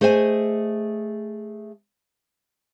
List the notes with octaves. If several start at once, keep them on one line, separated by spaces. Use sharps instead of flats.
A3 G#4 C5 D#5 E5 G#5